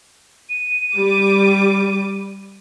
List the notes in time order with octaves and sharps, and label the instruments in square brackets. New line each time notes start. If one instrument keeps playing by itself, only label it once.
[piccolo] D#7
[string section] G3 D6